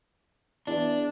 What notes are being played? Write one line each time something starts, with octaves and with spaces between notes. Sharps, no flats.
E2 D4